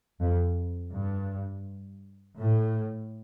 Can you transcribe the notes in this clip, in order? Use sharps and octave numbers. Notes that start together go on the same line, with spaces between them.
F2
G2
A2